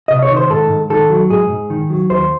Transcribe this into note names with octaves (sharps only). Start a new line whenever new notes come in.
C3 D#5
C#5
D#3
C5
G#2 A4
G#2
D#3 A4
F#3
G#2 G#4
G#2
D#3
F#3
D#2 C5